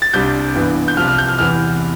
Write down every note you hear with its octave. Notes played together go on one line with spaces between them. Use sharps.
A6
C2 C3 G3 D4 G6
G2 E3 B3
G6
C2 C3 F3 F6
F6
G6
F6
E2 C3 E3 F6